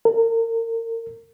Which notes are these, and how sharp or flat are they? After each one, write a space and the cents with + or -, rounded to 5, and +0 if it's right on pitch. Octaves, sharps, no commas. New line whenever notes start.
A#4 -35